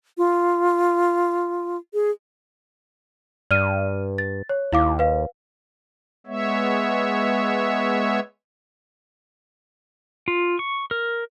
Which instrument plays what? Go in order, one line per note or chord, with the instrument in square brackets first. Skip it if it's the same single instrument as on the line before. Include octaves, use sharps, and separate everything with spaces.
[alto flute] F4
G#4
[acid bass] G2 [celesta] D5 F6 D#7
[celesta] A6
C#5
[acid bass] D#2 [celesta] E4 F5 D6
[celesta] B4 F5
[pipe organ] G#3 B3 C#5 E5
[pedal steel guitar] F4
C#6
A#4